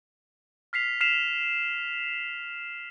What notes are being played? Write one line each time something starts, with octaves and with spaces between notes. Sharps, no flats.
F6 B6 C7 F7
F6 B6 C7 E7 F7